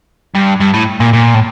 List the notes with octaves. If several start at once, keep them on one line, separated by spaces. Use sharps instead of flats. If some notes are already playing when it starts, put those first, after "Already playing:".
G2
G2
A2
A#2
A#2
A2